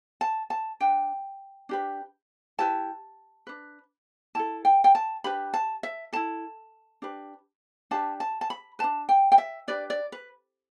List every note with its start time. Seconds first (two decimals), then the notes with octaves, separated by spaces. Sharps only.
0.21 A5
0.50 A5
0.81 D4 B4 G5
1.69 D4 G4 B4
2.58 E4 G4 B4 A5
3.47 D4 B4
4.35 E4 A4 A5
4.65 G5
4.84 G5
4.95 A5
5.24 D4 G4 B4 B5
5.54 A5
5.83 E5
6.13 E4 A4 A5
7.02 D4 G4 B4
7.91 D4 G4 B4 A5
8.20 A5
8.41 A5
8.50 B5
8.79 D4 B4 A5
9.09 G5
9.32 G5
9.38 E5
9.68 D4 G4 B4 D5
9.90 D5
10.12 B4